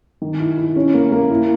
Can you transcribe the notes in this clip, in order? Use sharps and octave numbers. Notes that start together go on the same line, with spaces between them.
D#3
E4
E4
C#4
A#3
A#3
E4